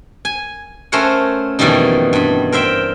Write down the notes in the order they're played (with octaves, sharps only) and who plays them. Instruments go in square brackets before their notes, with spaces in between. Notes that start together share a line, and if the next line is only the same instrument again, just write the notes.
[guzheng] G#5
A3 C#4 A#4 C5 C#5 F#5
F2 B2 D#3 E3 G3 D#4
G2 B5
A#4 C5 E5 G5